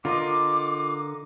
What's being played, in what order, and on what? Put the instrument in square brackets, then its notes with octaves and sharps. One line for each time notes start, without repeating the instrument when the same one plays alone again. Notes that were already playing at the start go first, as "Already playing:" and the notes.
[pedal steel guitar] D3 A#4 D#5 [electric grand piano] F4 [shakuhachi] D6